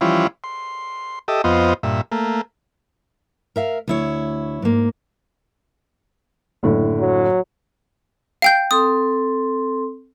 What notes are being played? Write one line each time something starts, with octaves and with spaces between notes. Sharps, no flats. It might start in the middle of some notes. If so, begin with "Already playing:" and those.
E3 F3 G3 C#4 E4 F4
C6
G4 A4 D#5 E5
F2 B3 F4 C5 D#5
G2 A#2 E5
A3 A#3
A#4 E5 F5
D2 E4 C#5
G#2 A#3
F#1 A2 D3
F#3
F5 G5 G6
C4 A4 C6 D#6